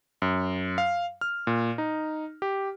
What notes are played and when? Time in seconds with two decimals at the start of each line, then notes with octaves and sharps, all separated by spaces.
0.22 F#2
0.78 F5
1.21 F6
1.47 A#2
1.78 D#4
2.42 G4